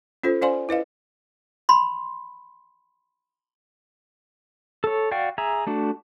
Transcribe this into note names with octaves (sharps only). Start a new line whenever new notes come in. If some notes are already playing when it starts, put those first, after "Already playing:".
C#4 F4 A4 C5
C#4 C5 D5 F5 G#5 C6
E4 B4 D#5 F5
B5 C6
A4 C#5
F#4 D5 F5 G5 C#6
G#4 E5 A#5
A3 D4 F#4